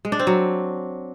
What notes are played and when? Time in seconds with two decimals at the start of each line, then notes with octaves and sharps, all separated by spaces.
0.05 G#3
0.12 D4
0.19 C4
0.27 F#3